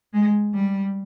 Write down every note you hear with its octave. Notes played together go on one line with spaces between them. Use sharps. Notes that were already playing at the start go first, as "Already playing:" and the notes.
G#3
G3